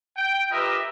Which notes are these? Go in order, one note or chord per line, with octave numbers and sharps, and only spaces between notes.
G5
F4 G4 A#4 B4 D#5 E5